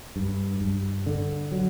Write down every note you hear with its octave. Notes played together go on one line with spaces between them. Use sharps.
G2
G2
D3
F#3